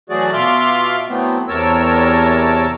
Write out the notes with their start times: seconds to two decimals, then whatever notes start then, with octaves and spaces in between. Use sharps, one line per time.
0.10 E3 F#3 A3 F#4 G#4 D5
0.33 B2 F4 E5 C6 D6 F6
1.08 E3 F#3 A3 B3 C4
1.48 E2 C3 A#4 C#5 A5 E6